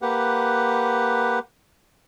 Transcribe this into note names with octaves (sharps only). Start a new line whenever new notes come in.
A#3 G4 B4 F#5